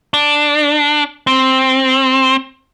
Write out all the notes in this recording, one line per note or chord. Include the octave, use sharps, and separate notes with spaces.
D4
C4